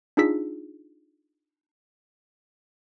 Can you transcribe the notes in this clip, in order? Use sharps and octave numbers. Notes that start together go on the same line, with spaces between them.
D4 D#4 F4 G#4 E6 B6